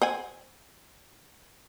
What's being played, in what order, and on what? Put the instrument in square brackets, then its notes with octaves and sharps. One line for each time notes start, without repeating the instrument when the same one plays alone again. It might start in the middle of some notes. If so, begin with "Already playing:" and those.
[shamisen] C5 F#5 G#5